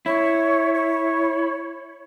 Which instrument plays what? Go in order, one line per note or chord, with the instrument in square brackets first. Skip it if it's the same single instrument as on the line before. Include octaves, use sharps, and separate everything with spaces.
[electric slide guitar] E4 [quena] C#5
[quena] C#5